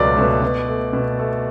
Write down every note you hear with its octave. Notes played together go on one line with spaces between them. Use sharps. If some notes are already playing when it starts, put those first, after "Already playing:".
Already playing: C#2 B2 F#3 A3 B4 D5
B2 F#3 A3
B2
A3
B2
A3